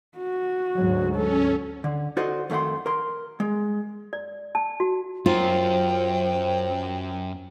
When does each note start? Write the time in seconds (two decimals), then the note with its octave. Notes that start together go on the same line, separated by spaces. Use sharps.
0.18 F#4
0.77 D2 G#2 F#3
1.15 C#4 A4
1.84 D3
2.17 D#4 F#4 A4 C5 D5 D#5
2.50 F2 D#3 A3 F#5 C6
2.86 A#4 C6
3.40 G#3
4.13 D5
4.55 A5
4.80 F#4
5.26 F#2 F4 A#4 C5 G5